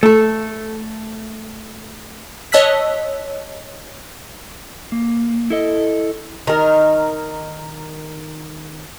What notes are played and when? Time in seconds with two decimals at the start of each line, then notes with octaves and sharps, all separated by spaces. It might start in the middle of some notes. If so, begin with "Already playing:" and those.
0.03 A3 A4
2.52 C#5 D#5 A5 E6 F#6 B6
4.92 A#3
5.50 E4 A4 D#5
6.47 D#3 A#4